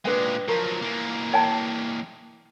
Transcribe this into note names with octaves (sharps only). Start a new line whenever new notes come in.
A#2 G#3 D4 B4 G5
F3 F#3 A#4
E3 A#3
C#5 G5 A5